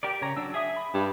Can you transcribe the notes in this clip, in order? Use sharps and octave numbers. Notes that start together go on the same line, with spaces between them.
G4 A#4 D5
C#3 C#5 A#5
F#3 D4 E6
G#4 E5 D#6
B5
G2